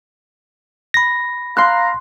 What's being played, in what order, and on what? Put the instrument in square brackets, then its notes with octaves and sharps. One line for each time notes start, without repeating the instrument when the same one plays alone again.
[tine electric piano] B5 A#6
[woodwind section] F5 A#5 [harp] C6 F#6